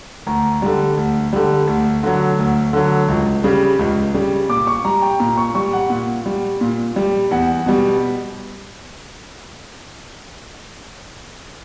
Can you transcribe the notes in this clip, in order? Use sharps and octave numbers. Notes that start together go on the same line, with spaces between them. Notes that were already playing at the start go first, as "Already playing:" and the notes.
D2 A#5
D3 G3
D2
D3 G3
D2
D3 F#3
D2
D3 F#3
C#2
C#3 G3
C#2
C#3 G3
A#2 D6
C#6
G3 A#5
G5
A#2 A#5
C#6
G3 C#6
F#5
A#2
G3
A#2
G3
E2 F#5
B2 G3